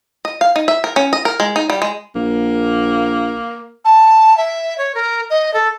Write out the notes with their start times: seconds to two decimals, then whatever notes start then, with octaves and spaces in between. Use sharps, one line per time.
0.25 D#5
0.41 F5
0.56 D#4
0.68 E5
0.84 A#4
0.96 C#4
1.13 D#5
1.25 A#4
1.40 G#3
1.56 D#4
1.70 G3
1.82 G#3
2.16 A#1 A#3
3.84 A5
4.37 E5
4.77 C#5
4.94 A#4
5.30 D#5
5.53 A4